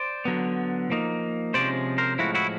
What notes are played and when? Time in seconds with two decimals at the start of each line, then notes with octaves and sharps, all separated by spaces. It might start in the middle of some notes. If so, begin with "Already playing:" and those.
Already playing: C5 D5
0.25 D3 F#3 B3
0.90 F3 A#3 D#4
1.54 C3 F3 G#3 C#4 C5 D5
1.98 A#4 C5
2.19 A2 F3 G#3 E4 F#4
2.35 E4 F#4